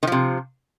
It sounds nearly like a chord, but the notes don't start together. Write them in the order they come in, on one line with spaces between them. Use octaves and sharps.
D#3 F3 C3